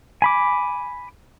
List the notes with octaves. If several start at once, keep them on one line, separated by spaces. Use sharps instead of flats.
G#5 B5 D6